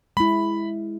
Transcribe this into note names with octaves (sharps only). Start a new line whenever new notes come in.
G#3 E4 B5